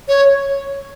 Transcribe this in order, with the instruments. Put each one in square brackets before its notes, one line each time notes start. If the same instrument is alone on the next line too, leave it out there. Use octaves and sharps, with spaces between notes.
[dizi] C#5